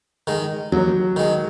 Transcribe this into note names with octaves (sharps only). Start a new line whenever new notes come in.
D#3 G#3
D#2 F#3
D#3 G#3